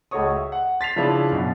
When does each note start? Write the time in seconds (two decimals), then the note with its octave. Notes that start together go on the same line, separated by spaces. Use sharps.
0.11 C#2 A3 F#4 C#5 C#6 D#6
0.36 E5
0.52 F#5
0.81 A6 B6 C7 F7
0.96 C#3 F3 D4 E4 F4
1.32 F#2 B2